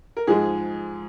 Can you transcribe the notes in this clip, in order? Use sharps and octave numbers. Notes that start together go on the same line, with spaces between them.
A#4
G#2 F3 G#3 G#4